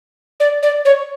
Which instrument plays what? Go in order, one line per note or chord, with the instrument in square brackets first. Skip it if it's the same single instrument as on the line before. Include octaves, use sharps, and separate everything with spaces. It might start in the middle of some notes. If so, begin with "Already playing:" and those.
[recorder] D5
D5
C#5